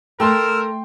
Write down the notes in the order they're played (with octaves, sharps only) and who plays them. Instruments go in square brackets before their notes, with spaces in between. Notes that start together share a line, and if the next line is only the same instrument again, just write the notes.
[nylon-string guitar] A3 [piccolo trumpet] A#4 [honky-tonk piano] G5 C6 [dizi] E6